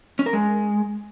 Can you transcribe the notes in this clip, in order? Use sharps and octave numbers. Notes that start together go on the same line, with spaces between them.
C#4
A#4
G#3